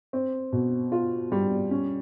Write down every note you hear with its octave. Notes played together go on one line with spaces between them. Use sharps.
C4
B2
F4
G3
C#4